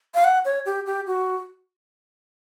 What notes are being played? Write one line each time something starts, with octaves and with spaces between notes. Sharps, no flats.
F5
F#5
C#5
G4
G4
F#4